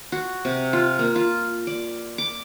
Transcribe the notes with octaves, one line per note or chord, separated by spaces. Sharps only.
F#4
C3
F4
A#3
F4
D5
D6